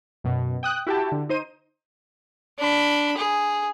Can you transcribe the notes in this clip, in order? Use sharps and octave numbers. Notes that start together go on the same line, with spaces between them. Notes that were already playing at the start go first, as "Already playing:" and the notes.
F#2 B2
G5 D#6 F#6
E4 F#4 G4 G5 A5
D3
D#4 C5 D#7
D4 B5
G#4